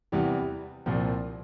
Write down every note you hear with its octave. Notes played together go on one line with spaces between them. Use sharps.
E2 C3 E3 G3
C2 A#2 F3 C4